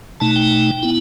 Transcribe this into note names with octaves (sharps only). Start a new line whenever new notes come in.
B2 A3 D#4 A5
G5
B3 E4